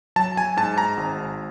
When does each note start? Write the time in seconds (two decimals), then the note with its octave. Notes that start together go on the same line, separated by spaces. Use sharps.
0.16 F#3 A5
0.37 G#5
0.57 G#2 A5
0.78 A#5
0.97 G#1